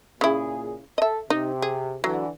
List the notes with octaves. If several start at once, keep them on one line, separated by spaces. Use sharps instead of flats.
A#2 C#3 E4 G#4
A4 D#5 E5
C3 D#4
G#4
D3 E3 F#3